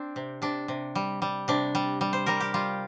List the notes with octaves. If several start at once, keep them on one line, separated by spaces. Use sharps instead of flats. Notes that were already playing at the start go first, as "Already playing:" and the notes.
Already playing: C4 D4
C3
C3 D4
C3
G3
G3
C3 D4
G3
G3
C5
G3 A#4
G4
G3 F4